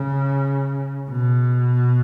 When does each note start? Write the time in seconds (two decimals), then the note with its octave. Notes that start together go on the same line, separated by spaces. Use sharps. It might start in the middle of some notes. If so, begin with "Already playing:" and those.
Already playing: C#3
1.10 B2